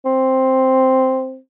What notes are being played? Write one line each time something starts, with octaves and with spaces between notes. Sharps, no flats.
C4